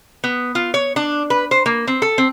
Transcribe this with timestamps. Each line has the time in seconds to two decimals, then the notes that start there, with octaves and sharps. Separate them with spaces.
0.24 B3
0.55 F4
0.74 C#5
0.96 D4
1.30 B4
1.51 C5
1.66 A#3
1.87 C4
2.02 A4
2.18 C4